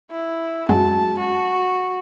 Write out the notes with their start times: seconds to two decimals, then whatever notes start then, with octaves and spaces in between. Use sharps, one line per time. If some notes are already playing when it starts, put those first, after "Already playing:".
0.11 E4
0.69 F#2 F#3 G#3 A5
1.19 F#4